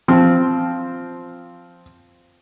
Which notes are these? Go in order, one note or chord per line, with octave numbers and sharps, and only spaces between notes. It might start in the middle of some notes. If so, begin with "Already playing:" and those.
F3 C4